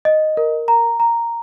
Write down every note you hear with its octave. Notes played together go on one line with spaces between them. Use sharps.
D#5
A#4
A#5
A#5